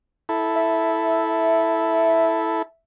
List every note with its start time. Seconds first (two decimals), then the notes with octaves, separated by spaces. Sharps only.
0.29 E4 A4
0.55 E5